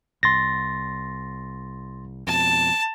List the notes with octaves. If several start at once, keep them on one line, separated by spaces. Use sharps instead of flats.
C2 C6 A6 A#6
F2 B2 A5